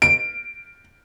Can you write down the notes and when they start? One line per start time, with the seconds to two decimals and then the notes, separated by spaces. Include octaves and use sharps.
0.02 D7